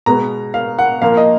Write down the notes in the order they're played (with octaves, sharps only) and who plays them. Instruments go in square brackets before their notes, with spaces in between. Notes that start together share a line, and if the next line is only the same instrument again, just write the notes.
[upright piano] B2 G#3 B3 A#5
F5
F#5
A#2 F3 A#3 F5
D#5